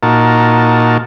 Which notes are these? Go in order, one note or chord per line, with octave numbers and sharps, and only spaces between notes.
A#2 D#4 F#4 A#4 A5